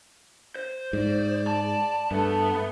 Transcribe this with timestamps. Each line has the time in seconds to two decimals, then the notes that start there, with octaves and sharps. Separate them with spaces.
0.55 C5
0.93 G#2 D5
1.47 A5
2.11 G2 A3 B3 A4 B4